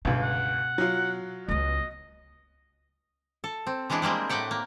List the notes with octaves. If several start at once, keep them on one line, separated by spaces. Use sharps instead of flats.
G1 C#2 B2
F#5
F#3 F4
C#2 B3 D#5
A4
C4
E3 G#3 B3 D4 E4
G3 G#3 A#3 C4
A2 A3 D5 F#5 G5
A#3